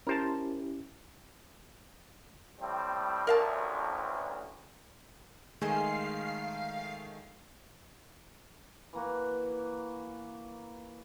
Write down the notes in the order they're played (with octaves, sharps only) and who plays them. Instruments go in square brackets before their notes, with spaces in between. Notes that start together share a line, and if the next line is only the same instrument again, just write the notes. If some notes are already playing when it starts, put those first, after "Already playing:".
[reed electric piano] C#4 E4 G4 [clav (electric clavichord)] A#4 C5 A5
[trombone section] A2 G3 C4
[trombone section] A1 D2 [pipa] A#4 F5 A5
[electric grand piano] D#3 G#3 A3 [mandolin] G#4 C5 D#5 [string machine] F5 C7
[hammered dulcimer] E3 A#3 F#4